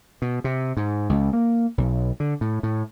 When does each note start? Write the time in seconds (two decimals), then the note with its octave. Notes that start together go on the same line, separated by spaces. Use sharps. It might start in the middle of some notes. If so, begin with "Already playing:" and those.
0.22 B2
0.44 C3
0.77 G#2
1.09 C#2
1.33 A#3
1.78 B1
2.20 D3
2.41 A2
2.63 A2